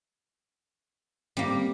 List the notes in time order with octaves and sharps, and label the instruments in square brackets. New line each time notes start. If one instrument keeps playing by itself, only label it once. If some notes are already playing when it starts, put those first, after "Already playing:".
[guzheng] G3 A#3 [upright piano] C4